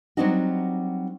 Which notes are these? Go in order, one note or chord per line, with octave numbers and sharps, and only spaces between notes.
F#3 G3 C4 D4 D#4 F#4